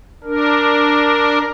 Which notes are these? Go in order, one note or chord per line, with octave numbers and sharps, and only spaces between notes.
D4 A#4